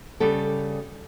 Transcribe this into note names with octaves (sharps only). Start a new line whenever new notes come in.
C#3 G3 G4 A4